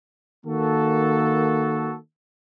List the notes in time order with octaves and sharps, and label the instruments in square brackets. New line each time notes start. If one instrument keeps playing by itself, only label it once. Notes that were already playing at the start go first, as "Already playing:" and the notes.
[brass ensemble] D#3 A#3 F#4 A4